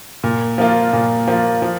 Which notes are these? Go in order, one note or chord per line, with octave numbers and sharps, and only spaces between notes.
A#2
F3 A#3 F4
A#2
F3 A#3 F4
F3